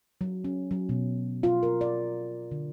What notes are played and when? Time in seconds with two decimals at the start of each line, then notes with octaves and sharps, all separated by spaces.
0.21 F#3
0.44 C#4
0.71 F#3
0.89 B2
1.43 F4
1.63 A#4
1.81 D5
2.51 D3